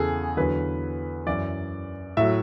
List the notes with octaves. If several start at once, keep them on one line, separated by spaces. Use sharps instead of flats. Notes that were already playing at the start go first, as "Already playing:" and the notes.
Already playing: E2 C#3 G#4 A4
E2 D3 F#3 B4
F#2 E3 D5
A2 F#3 E5